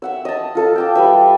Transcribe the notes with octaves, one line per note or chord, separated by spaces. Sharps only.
E5 F#5 E6
D#5 A5
F4 A4 A5
G5 A5 D6
G3 B4 E5